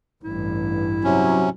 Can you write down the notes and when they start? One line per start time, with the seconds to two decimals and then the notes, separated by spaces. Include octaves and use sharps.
0.24 A1 G2 E4
1.04 C3 F#3 C#4